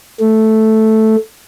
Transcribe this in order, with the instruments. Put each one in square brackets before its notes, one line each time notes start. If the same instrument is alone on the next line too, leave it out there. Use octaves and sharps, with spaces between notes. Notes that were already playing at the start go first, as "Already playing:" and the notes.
[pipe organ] A3